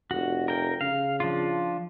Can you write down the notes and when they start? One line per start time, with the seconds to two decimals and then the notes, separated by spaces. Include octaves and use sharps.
0.11 F1 F#4
0.48 A#4 G5
0.81 C#3 F5
1.20 F3 D4 F4